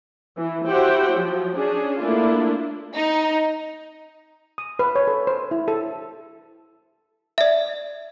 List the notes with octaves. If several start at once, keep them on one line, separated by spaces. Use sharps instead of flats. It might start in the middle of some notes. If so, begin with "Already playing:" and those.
E3
E4 F#4 G4 C5 F#5 G5
F3 F#3
C#4 D4 G#4
A3 A#3 D4 E4 F4
D#4
D#6
B4
C#5
A4
C5
E4
A4
D5 E5